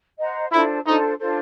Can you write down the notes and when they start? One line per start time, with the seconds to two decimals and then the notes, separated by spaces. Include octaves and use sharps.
0.19 C5 D#5 F#5 A#5
0.51 D4 E4 F4 A4 C5
0.86 D4 D#4 F4 A4 C5
1.19 D4 F4 A4 C5